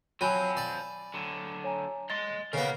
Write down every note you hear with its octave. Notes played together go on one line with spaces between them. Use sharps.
F3 F#3 C4 G#5 B5 D#7
D5
D3 F#3
C#5 G#5 A#5
D#5 C6 A6 G7
C#3 B3 A#4 F5